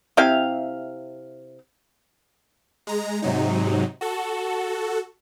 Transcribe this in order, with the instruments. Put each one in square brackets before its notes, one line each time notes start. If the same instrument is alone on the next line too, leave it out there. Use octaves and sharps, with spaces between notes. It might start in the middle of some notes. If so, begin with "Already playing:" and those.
[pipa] C3 E4 G4 F5
[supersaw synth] G#3 A#5
G#2 C3 F#3 D#4
F#4 A4